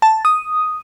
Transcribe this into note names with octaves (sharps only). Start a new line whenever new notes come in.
A5
D#6